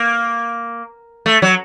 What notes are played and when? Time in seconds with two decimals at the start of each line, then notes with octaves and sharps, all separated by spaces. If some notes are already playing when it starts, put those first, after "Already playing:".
Already playing: A#3
1.26 A3
1.42 F#3